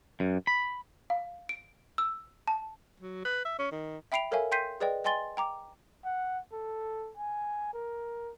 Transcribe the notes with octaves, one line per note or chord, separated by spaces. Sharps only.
F#2
B5
F5
D7
E6
A5
F#3
B4
E5
C#4
D#3
E5 G5 B5 C7 D7 F7
A4 A#4 C#5 E5 F5 G#5
G5 C6 G6 B6 C7 D#7
G#4 B4 D5 D#5 G5
D#5 G5 G#5 C6 A6 G7
G5 A#5 D6
F#5
A4
G#5
A#4